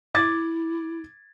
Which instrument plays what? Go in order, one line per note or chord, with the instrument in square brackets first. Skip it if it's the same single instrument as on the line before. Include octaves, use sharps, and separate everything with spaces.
[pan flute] E4 [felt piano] D6 G#6 A6